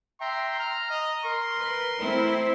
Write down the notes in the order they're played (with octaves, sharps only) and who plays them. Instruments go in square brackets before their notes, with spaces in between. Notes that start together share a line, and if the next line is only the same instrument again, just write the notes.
[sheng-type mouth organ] E5 G5 A#5 [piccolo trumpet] C6
[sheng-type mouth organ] A#5 [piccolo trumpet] F6
[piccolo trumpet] D#5
[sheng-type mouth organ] A#4 [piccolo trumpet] C6
[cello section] B4
A3 C4 E4